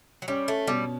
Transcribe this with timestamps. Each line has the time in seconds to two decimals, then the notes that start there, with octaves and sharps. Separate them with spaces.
0.22 F#3
0.28 G3 C#4
0.48 A3
0.67 B2 G3